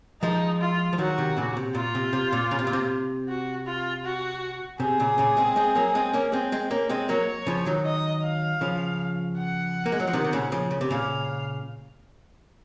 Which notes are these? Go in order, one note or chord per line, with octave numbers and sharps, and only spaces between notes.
F3 G#3 D#4
F4
F3
D#3 F#3 F#4
C3 D#3
A#2 C#3
C3
A#2 F4
C3
C3
A#2
C#3
C3
A#2
C3
F#4
F4
F#4
C3 G#4
A#2 C#3
A#2 C#3
G#3 C4
G#3 C4
F#3 A#3
G#3 C4
A#3 C#4
G#3 C4
G#3 C4
A#3 C#4
G#3 C4
F#3 A#3 C#5
C#3 F3
D#3 F#3
D#5
F5
C#3 F3
F#5
A#3
G#3
F#3
F3
C3 D#3
C3
A#2 C#3
C#3 F3
C#3
C3
A#2 C#3 F5